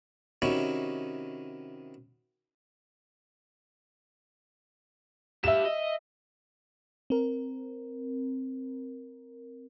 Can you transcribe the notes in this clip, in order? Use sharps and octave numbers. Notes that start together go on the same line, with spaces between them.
C3 D#3 C#4 D#4 E4 F#4
G4 E5 F5 E7
D#5
C4 A#4